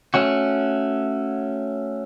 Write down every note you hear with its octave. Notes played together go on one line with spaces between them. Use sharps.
A3 C#4 F#4